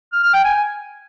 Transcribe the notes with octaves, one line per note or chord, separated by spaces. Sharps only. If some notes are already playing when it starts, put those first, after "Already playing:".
F6
F6
G5
G#5